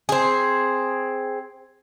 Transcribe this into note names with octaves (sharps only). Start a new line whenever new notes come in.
C4 G#4